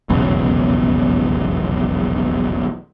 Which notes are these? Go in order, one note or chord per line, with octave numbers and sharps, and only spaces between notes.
F1 B1 E2 C#3